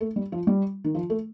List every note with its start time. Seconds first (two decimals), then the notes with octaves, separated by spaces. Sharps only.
0.01 A3
0.16 G3
0.32 F3
0.47 G3
0.84 D#3
0.95 F3
1.10 A3